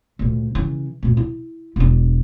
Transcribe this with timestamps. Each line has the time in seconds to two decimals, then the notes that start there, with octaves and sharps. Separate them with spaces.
0.19 D2 A#2
0.55 C#3 E3
1.03 D2 A#2
1.17 E4
1.76 E1 D4